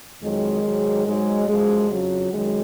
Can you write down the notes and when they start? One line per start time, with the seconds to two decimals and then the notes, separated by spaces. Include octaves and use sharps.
0.21 F2 D#3 F#3 G#3
0.63 G#2 D#3 F#3
1.05 G#2 F#3 G#3
1.47 F#2 F3 G#3
1.89 F2 C#3 F3 F#3
2.31 F#2 D#3 F#3 G#3